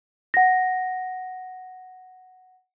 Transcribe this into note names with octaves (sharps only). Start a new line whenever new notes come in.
F#5 A#6